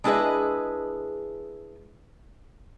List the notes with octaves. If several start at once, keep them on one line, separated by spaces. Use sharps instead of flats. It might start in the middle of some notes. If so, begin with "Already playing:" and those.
G#3 D4 E4 G#4 B4 D#5